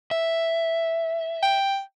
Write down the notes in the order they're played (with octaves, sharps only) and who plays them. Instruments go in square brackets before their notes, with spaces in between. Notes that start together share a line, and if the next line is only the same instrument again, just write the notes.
[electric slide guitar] E5
[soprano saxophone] G5